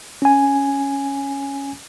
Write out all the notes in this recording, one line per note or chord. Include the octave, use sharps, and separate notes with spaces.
C#4 G#5